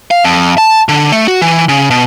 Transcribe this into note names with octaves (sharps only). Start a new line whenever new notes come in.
F5
F2
A5
D3
A3
F#4
E3
C#3
B2